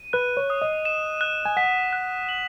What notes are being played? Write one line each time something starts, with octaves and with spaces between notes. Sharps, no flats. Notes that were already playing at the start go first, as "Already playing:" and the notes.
Already playing: D#7
B4 F#6
C#5
D#6
D#5
E7
F#6
G#5
F#5 B6
F#6
F#7